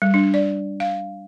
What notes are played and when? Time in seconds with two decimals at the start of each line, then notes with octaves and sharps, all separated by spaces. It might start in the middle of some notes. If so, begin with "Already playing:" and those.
0.02 G3
0.14 D4
0.34 D5
0.80 F5